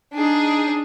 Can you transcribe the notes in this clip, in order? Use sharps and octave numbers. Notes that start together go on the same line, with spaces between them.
D4 D#4 G#4